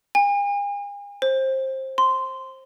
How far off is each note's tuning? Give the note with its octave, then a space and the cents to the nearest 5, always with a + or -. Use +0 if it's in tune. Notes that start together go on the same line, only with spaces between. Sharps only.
G#5 -40
C5 +20
C6 -10